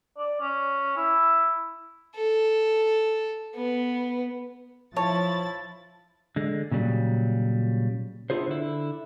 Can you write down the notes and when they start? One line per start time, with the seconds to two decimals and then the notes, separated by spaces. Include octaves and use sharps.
0.18 D5
0.40 C#4
0.97 E4
2.16 A4
3.55 B3
4.96 F3 E4 C#5 A5 A6
6.36 D3 G#3
6.72 A#2 C#3 F#3 G3
8.30 B3 D4 E4 F4 G#4 C5
8.47 D3 E4